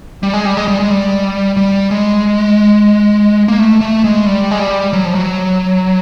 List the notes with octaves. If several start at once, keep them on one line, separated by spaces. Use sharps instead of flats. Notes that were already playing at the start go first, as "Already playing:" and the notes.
G3
G#3
G3
G#3
G3
G#3
G3
G3
G#3
A#3
A3
A3
G#3
G3
G#3
G3
F#3
F3
F#3